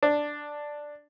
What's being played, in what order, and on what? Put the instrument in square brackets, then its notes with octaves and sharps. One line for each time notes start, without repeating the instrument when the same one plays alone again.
[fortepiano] D4